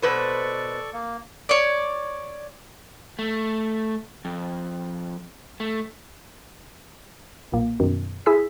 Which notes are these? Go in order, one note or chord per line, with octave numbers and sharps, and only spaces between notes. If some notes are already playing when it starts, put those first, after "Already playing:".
B2 A4 B4 C5 D5 C#6
A#3
C#5 D5
A3
F2
A3
B1 A#2 A#3
F#2 B2 D#3
E4 G#4 G#5 E6 B6